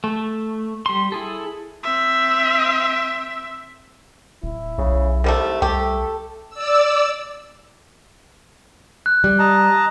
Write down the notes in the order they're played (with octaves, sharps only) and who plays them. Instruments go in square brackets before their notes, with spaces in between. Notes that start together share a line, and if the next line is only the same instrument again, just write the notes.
[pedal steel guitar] A3
G3 C6
E4 G#4 A4
[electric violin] C4 E5
[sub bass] D1 [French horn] E4
[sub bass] B1 [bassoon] C#3
[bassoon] C2 [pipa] D#3 G3 A3
[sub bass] C2 [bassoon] A3 [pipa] G4 [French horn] A4
[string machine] D5 E6
[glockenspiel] F#6
[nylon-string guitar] G3
[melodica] D#5 A5 A#5